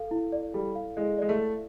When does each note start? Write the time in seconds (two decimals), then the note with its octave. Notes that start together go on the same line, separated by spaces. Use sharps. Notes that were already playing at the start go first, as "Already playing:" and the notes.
Already playing: A4 F5
0.11 E4
0.32 D5
0.54 G3 A4
0.75 F5
0.97 G#3 E4
1.18 G#3 D5
1.29 A3
1.39 A4